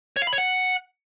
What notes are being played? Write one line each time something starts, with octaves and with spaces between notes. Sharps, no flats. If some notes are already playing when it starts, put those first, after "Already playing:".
C#5
F5
B5
C#5
F#5